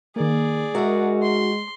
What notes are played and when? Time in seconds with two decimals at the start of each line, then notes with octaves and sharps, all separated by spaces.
0.16 D#3 A#3 G#4 D5
0.75 G#3 D#4 F#4 A#4 E5 F#5
1.22 C6